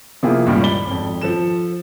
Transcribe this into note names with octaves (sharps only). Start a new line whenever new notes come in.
C3 F3 A#3 E4 F4 G#4
C#2 G2 A#2 D#3 G3 A#3
D5 B5 G7
G#1 F2
F3 A4 E7